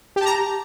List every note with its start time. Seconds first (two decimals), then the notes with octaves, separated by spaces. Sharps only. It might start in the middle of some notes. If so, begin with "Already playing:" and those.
0.16 G4
0.21 A5
0.26 A#5